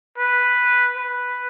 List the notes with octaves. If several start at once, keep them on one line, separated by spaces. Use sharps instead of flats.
B4
B4